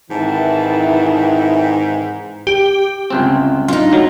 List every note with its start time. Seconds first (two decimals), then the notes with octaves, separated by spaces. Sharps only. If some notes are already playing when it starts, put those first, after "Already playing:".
0.11 G#2 C3 D#3 E3 A5
2.47 G4
3.10 G1 C#2 C4
3.68 D4 D#4 F4
3.92 D2 F#3